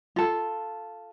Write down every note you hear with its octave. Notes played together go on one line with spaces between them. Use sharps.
F4 A4